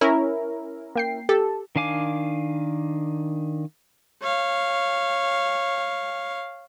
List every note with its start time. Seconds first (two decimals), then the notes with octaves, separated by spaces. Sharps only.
0.01 C#4 E4 A#4
0.96 A#3 G5 C7
1.29 G4 A4
1.76 D#3 D4 F5 G#5 D6
4.22 C#5 F5